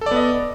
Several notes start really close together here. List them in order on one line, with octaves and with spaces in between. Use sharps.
A4 D5 B3 D#5